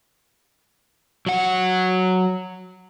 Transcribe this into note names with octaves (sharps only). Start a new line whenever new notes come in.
F#3 F#5